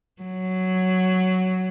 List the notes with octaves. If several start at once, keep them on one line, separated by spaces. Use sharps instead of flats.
F#3